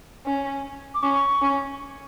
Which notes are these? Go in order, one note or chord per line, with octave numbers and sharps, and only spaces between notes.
C#4
D6
C#4 C#6
C#4